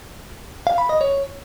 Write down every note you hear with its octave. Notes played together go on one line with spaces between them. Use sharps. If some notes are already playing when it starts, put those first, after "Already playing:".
F5
B5
D#5
C#5